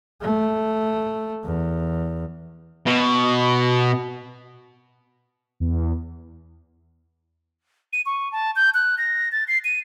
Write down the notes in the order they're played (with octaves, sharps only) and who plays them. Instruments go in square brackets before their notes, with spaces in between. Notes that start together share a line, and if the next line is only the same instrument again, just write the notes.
[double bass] A3
E2
[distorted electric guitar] B2
[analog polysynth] E2
[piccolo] D#7
C#6
A5
G6
F#6
A#6
A6
C7
D#7